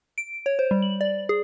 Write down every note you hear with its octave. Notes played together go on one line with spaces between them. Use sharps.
D7
C#5
C5
G3
F#7
D5
G#4